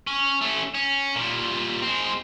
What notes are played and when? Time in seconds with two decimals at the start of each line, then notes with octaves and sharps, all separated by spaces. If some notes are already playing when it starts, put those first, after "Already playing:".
0.07 C#4
0.41 A3 C#4
0.75 C#4
1.16 A#2 G3
1.82 G#3 C4